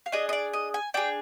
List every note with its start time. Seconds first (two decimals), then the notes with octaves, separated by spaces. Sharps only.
0.06 F5
0.12 D4 G#4 D#5
0.29 D#5
0.33 D5
0.53 D#5
0.74 G#5
0.94 D4 G#4 G5